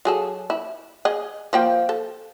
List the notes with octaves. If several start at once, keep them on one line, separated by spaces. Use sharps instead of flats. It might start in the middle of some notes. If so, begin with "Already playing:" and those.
F#3 G#4 A4
E4
G#4 D#5
F3 A#3 G5
A4